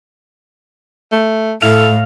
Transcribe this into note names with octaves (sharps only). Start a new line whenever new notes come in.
A3
A2 E4 A4 F5